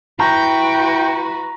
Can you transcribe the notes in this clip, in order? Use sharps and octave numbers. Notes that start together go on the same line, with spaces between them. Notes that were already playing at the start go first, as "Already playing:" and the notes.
E4 F#4 B4 G5 A#5